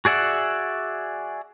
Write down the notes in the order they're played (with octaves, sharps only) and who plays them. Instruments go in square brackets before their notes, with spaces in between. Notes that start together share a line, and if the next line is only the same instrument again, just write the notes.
[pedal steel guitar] F#4 G#4 D5 E5 F#5